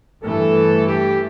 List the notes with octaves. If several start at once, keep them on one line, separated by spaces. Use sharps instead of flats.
G2 E3 A3 A4
G4